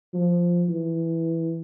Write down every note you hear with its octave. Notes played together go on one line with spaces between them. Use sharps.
F3
E3